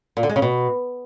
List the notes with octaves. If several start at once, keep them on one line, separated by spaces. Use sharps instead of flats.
A#2
D3
G#3
C#3
B2